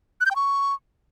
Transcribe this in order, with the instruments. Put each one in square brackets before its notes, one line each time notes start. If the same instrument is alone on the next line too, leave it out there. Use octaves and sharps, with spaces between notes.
[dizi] F#6
G6
G5
C#6